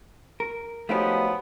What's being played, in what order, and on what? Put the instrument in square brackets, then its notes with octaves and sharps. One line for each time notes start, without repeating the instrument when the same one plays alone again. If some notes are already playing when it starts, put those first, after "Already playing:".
[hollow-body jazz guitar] A#4
[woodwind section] F3 F#3 B3 [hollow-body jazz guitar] A3 D#4 G4